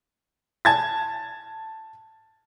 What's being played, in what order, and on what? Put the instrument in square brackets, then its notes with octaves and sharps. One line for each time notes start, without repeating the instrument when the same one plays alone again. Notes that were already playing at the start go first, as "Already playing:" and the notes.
[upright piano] A5 G#6 A6